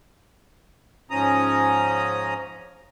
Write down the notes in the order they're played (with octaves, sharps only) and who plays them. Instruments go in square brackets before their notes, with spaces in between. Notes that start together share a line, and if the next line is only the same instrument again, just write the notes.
[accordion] G#2 F3 C#4 A#5 D#6